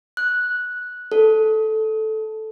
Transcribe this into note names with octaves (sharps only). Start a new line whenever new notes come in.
F#6
A4